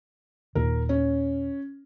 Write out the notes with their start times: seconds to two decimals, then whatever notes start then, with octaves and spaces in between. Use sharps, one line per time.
0.55 D#1 A#2 D#3 A#4
0.89 C#4